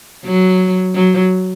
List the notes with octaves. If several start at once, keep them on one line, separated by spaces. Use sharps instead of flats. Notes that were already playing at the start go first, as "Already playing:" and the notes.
F#3
F#3